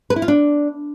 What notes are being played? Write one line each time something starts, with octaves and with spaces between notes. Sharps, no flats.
B4
E4
F4
D4